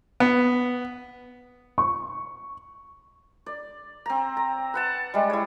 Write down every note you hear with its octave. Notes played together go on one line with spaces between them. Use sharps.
B3
C#6
D5
C4 A#5
A#5
B4 F#5 A5
G3 G#3
E4 C#5